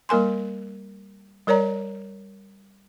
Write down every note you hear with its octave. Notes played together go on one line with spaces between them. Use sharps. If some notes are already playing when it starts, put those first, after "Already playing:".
G3 A#3 A#4 G#5 C6
G3 A#4 C#5 D5 A#5